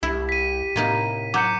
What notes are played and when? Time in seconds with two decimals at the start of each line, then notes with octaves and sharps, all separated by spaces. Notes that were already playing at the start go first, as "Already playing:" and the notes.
0.03 C2 E4 G4
0.29 B6 D#7
0.76 A2 C3 A#3 D#4
1.34 F#3 A#5 D6 G6 C#7